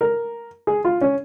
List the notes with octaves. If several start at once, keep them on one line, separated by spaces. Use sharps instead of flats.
A#4
G#4
F4
C#4